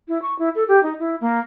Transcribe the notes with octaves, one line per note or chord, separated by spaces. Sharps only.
E4
C#6
E4
A4
G4
D#4
E4
A#3